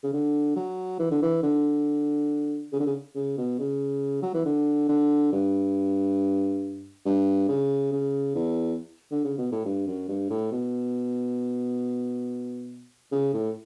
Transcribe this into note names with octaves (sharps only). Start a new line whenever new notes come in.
C#3
D3
F#3
E3
D3
E3
D3
C#3
D3
C#3
C#3
B2
C#3
F#3
E3
D3
D3
G2
G2
C#3
C#3
E2
D3
C#3
B2
A2
G2
F#2
G2
A2
B2
C#3
A2